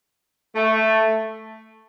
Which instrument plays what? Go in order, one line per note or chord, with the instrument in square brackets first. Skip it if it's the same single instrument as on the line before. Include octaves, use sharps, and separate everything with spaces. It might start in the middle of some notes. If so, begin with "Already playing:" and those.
[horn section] A3